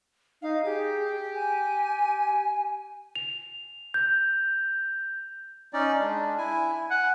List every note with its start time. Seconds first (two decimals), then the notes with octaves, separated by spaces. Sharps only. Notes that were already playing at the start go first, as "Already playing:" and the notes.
0.42 D#4 F5
0.65 G4 G#4
1.35 G#5
3.16 F7
3.94 G6
5.73 C#4 D#4 D5
6.00 G#3 D4
6.38 E4 G#5
6.90 F#5 G#5